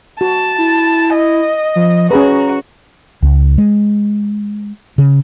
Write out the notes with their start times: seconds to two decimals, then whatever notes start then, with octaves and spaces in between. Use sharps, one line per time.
0.21 F#4 A5
0.58 E4
1.14 D#5
1.76 F3
2.11 C#4 F#4 G#4 B4 A#5
3.23 C#2
3.58 G#3
4.98 C#3